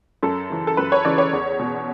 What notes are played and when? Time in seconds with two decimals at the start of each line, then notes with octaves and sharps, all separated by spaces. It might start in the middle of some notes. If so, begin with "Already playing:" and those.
0.23 F#2 A4
0.50 C#3 E3
0.67 A4
0.77 F#2 B4
0.92 C#5
1.05 C#3 E3 D5
1.18 C#5
1.33 E2
1.59 B2